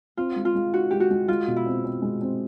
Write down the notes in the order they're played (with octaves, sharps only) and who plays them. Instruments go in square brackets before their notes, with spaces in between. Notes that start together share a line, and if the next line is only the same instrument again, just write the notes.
[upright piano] C4 [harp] F4
[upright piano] G#3
[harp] F4
[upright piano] G#3
[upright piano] D#4 [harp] F#4
[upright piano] G#3 [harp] G4
[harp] F#4
[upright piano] G#3
[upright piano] G#3 [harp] F4
[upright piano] B2
[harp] E4
[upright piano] C4
C4
G#3
C4